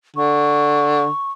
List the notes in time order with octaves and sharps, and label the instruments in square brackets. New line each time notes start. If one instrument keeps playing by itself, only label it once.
[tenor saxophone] D3 [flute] C#6